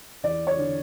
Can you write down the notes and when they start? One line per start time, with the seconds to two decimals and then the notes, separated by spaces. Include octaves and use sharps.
0.23 E2 D5
0.47 C#5
0.59 D3